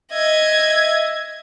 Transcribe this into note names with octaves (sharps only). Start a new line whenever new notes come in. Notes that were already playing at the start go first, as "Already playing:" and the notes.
D#5 E5 G#6